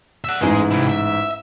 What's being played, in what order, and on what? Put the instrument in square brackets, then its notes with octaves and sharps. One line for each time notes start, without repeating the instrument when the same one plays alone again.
[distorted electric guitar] E5 F#5
[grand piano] A1 G#2 [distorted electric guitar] G#3 G#4
[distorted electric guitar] C3 E4
E5